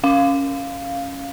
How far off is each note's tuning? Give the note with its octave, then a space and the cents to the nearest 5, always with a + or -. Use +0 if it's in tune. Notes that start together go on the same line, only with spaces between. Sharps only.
C#4 +0 F5 +0